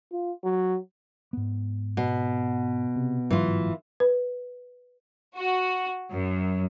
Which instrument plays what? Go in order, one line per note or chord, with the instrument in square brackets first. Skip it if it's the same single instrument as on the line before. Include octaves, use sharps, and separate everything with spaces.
[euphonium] F4
F#3
[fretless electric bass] G#2 B3
[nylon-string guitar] B2
[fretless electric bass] C3
[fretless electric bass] G1 G#2 F#3 [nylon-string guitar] E3 F4
[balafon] B4
[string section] F#4
F#2